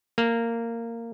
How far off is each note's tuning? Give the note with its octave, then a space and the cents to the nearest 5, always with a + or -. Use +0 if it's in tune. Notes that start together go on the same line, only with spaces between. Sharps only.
A#3 -15